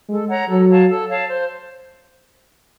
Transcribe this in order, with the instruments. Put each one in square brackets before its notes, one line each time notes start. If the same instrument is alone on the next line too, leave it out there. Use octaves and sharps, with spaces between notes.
[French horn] G#3 [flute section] A4
[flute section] C#5 F#5 A#5
[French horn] F#3 [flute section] A4
[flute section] C#5 F5 A5
A4
C#5 F5 A5
C5